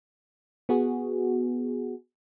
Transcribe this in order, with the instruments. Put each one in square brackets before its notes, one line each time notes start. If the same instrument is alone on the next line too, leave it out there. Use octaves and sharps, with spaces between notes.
[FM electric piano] B3 F#4 G#4